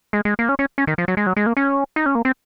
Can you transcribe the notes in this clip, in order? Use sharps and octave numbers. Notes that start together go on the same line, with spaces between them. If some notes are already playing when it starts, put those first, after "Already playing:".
G#3
G#3
A#3
C#4
C#4
C#4
D#3
F3
F#3
G#3
F#3
G#3
A#3
C#4
D#4
C#4
A#3
C4